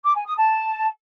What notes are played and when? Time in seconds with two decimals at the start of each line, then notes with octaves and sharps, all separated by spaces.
0.04 D6
0.15 G#5
0.26 D#6
0.36 A5